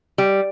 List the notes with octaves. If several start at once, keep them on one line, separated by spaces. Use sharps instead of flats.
G3